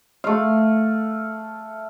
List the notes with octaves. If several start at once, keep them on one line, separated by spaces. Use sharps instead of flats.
A3 F5